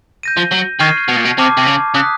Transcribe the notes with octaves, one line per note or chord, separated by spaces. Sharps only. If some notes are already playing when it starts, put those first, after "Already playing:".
G6 A#6 D#7
F3
F#3
D#3 C#6 F6 G#6 C7 D#7
B2
A#2
B2
C3 A5 D6 F6
C3
C#3
C#3 D#6 F#6 B6